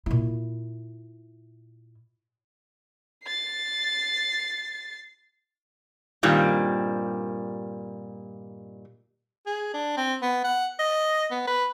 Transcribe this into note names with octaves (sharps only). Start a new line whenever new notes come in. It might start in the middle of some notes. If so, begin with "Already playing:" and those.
A#2 E4
A6 C7
G2 A#2 D#3 G3 C4
G#4
D4
C4
B3
F#5
D#5
B3
B4